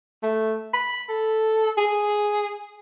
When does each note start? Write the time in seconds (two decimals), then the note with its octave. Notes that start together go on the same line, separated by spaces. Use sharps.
0.23 A3
0.74 B5
1.09 A4
1.77 G#4